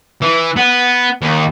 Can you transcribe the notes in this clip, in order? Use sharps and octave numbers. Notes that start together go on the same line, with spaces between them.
E3
B3
D#2 D#3